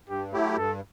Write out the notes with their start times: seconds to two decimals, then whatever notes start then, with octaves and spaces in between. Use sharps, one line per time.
0.09 G2 G4
0.32 F#3 A3 E4 G4
0.57 G2 A4